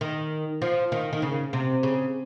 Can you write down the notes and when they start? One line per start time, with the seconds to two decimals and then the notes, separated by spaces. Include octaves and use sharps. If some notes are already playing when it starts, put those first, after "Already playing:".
0.01 D#3
0.62 F3
0.92 D#3
1.13 D#3
1.22 C#3
1.53 C3
1.83 C#3